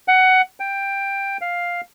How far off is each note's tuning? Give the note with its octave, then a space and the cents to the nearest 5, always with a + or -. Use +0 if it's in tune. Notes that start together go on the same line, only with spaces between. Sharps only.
F#5 +15
G5 +10
F5 +5